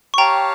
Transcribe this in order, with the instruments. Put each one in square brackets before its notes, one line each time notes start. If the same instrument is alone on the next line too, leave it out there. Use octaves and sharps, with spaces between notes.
[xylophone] C#6
[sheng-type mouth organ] G4 C#5 F5 A5 [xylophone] G5 A#5